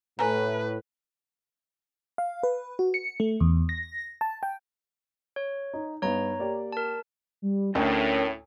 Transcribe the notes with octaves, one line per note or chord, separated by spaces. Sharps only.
A2 B4 G#5 A#5
F5
B4
F#4
C#7
A3
E2
A#6
A5
G5
C#5
D#4
G2 B3 D#4 C#5 A#5
A#3 G4 D5
A#4 A5
G3
D2 A2 C#4 A#4 C#5 G5